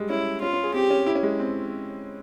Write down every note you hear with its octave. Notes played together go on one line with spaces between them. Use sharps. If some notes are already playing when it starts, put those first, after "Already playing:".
Already playing: G3 G#3
C#4 E4
C#4 F4
C#4
G#4
C4 G4
C#4
E4
C#4
G#3
C4